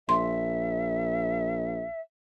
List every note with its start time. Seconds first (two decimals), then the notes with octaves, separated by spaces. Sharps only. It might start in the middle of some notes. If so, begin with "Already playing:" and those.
0.09 A#1 E5 C6